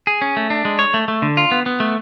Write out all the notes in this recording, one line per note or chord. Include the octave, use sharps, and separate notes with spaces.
G#4
C#4
A3
D4
G#3
C#5
A3
A3
D3
F4
B3
B3
A3